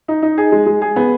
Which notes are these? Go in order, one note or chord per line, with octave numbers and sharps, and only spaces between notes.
D#4
D#4
G#4
G#3
G#3
G#4
B3